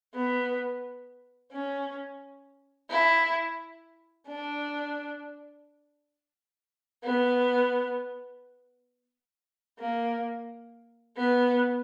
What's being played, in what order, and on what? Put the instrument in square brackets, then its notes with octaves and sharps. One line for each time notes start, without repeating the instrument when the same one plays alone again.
[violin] B3
C#4
E4
D4
B3
A#3
B3